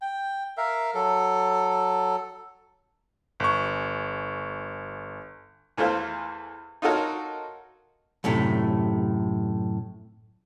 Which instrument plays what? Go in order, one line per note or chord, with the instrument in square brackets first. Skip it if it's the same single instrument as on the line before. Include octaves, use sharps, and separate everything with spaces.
[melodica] G5
A#4 E5 F5
F#3 A4
[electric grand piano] G1 C#6
[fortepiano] E2 E3 A3 F4 C5 F5
D#4 F4 F#4 A4 A#4 C#5
[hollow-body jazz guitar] F#2 A2 C3 A3